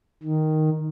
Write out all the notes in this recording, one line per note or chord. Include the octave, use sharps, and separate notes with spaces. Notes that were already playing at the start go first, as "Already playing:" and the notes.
D#3